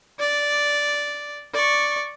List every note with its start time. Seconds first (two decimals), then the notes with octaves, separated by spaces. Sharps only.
0.20 D5
1.54 D5 C#6